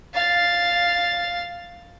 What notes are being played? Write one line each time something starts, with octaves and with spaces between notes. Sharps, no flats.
F5 A6